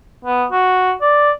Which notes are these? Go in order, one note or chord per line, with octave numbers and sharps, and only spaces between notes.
B3
F#4
D5